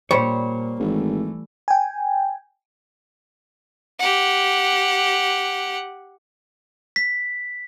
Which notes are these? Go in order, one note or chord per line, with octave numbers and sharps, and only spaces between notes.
A#2 G3 A#3 C5 C#5
G#1 E3 A3
G5 G#5
G4 F#5
B6